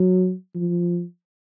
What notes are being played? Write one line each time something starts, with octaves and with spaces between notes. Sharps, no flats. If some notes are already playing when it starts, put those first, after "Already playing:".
Already playing: F#3
F3